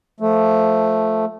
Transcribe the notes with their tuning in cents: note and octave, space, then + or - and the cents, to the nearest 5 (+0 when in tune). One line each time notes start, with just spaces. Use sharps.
F3 +0 A3 +0